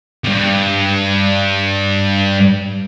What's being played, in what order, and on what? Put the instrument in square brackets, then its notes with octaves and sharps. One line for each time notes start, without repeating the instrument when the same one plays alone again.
[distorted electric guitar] E2 G2